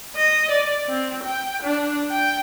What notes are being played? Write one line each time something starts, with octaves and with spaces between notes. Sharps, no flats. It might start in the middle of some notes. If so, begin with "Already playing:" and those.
D#5
D5
C4
G5
D4
G5